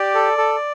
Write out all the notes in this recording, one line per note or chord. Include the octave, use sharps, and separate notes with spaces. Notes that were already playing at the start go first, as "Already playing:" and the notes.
Already playing: G4 D5
A4
A4